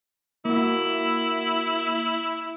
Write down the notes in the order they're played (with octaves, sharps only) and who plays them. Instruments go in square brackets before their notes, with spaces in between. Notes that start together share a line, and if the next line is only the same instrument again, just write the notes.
[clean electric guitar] A#3 F#4 [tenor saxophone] E4